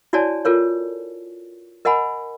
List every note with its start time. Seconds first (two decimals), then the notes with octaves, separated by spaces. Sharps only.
0.13 E4 F#4 C#5 D5 G#5 A5
0.45 F4 A4 A#4 C#5
1.85 A#4 D#5 F#5 G#5 B5